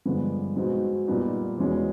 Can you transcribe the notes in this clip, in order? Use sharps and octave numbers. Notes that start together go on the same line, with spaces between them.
G2 D3 F3 G#3 B3
B2 G#3 C4 D#4
A#2 G3 B3 D#4
E2 B2 G#3 C#4